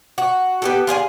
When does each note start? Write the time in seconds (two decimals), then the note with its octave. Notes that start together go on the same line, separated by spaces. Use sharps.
0.18 F#4
0.62 B3 G4 A4
0.87 F4 G#4 C5 G#5